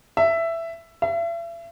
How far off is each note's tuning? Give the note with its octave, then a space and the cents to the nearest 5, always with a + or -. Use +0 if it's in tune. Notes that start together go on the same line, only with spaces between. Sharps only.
E5 +10
E5 +40